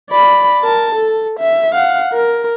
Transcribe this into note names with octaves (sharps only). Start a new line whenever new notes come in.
D5 B5
A#4 A5
A4
E5
F5 F#5
A#4